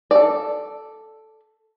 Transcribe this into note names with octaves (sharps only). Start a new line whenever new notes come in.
A4 D5